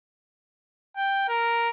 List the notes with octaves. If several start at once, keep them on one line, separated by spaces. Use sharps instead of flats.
G5
A#4